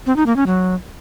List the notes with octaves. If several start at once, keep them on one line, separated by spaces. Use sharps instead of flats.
C4
D#4
A#3
C#4
F#3